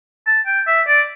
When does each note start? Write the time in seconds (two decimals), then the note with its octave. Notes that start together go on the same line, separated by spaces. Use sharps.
0.27 A5
0.47 G5
0.67 E5
0.87 D5